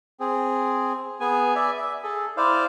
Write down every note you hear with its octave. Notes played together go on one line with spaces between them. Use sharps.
C4 G#4
B3 G#4 G#5
D5 E5 G#5
E5
G#4 A4
E4 C5 D5 F5